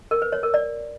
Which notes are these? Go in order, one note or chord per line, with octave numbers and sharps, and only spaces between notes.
A#4
B4
C#5
A#4
D5